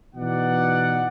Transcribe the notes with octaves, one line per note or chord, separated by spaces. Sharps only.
B2 E3 D#4 D5 F#5